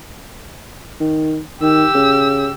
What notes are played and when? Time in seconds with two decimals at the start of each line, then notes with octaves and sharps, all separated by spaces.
1.00 D#3
1.62 D#3 G4 E6
1.95 C#3